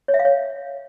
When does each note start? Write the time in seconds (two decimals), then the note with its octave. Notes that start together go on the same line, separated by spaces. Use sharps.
0.08 C#5
0.14 E5
0.19 F5
0.25 C#5